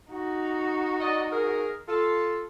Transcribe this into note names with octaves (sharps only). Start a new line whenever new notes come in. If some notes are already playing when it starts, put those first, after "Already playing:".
D#4 F#4
D5 D#5
G#4 A#4
F4 A4